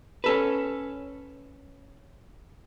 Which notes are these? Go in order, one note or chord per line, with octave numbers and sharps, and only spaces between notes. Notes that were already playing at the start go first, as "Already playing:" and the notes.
C#4 A4 B4